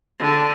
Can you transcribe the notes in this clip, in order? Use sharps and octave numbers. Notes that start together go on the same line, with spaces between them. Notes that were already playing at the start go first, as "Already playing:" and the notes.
D3